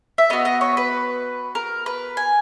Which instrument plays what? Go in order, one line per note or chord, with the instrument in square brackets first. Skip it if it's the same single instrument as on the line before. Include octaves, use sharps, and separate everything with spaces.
[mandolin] E5
B3 F#4 D#5
D#5
C#5
B4
A#4
B4
G#5